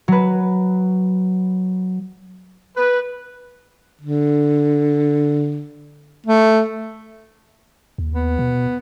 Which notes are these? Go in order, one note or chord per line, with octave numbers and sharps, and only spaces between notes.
F#3 B4
B4
D3
A3
D#2
B3
B2